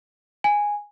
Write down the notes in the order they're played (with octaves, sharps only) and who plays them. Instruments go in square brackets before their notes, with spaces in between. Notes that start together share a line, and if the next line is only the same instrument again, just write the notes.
[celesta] G#5